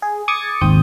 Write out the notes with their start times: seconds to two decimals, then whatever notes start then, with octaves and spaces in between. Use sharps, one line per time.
0.02 G#4
0.28 D6 D#6 G#6 A6 C#7
0.61 G#1 D#2 C3 C4 D#6 G6